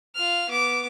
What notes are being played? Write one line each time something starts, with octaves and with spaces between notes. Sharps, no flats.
F4 F6
B3 D6